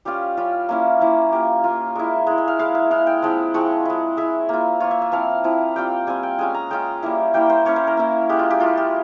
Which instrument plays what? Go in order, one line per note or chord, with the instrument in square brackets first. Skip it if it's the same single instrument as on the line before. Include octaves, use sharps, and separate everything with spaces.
[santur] G3 C#4 F4 G4
G3 C#4 F4
A#3 C#4 E4 F4
A#3 C#4 E4
A#3 F4 G4
A#3 F4
G#3 E4 A#4
G#3 E4
E5
F5
G#3 E4 F5
E5
G#3 E4 F5
G5
F3 G#3 C4 E4
F3 G#3 C4 E4 C#6
G#3 E4
G#3 E4 E5
A#3 F4
A#3 F4 C#5
E5
E5
F3 C4 E4 F5
F3 C4 E4
G3 C4 F4 G5
G3 C4 F4 G#5
G5
G#3 C#4 F4 G#5
A#5
G#3 C#4 F4 G5
G3 A#3 E4
G3 A#3 E4 G5
C5
A#3 C#4 E4 C#5
C5
A#4
A#3 C#4 E4
G#3 E4 G4
F4
G4
G#3 E4 F4
G4